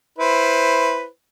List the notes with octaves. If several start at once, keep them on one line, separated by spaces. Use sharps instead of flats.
E4 B4 C5